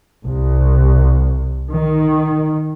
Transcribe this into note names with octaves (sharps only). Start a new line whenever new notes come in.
C2
D#3